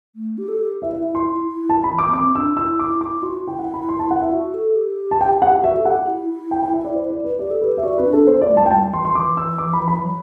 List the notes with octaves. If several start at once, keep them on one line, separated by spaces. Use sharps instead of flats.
A3
G4
A4
G4
E4 E5
E5
E4
C6
E4
E4
A5
B5
E3
D6
B3
C4 D6
D4 E6
E4 E6
E4 D6
E4 D6
E4
F#4 C6
E4 G5
F#5
B5
C6
A5
F#5
E5
F#4
A4
G4
A5
G5
F#5
F#4 E5
A4
G4 F#5
E4
E4
G5
G5
E5
D5
C5
D5
B4
G4 D5
A4
G4 B4
E5
F#4 D5
C4 B4
D4
A4
B3 C5
D5
A3
G3 A5
A3 G5
G3 A5
E3 C6
C6
E3 D6
E6
D6
B5
B5
F#3